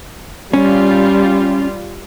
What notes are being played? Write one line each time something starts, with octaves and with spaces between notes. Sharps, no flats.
G3 C#4 F4